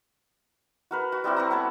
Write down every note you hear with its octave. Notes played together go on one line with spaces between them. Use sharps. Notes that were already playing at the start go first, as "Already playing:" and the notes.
F#4 A#4 B4
F#4
G3 C4 E4 F#4
C4 B4 A#5
B3 A4 C#5 F#5